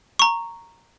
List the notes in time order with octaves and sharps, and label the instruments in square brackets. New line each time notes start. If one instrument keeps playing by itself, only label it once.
[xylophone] A#5 C#6